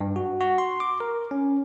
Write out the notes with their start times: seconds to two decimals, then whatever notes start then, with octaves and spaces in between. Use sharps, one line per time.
0.01 G2
0.16 F#4
0.41 F#4
0.58 C6
0.80 D6
1.00 A#4
1.31 C#4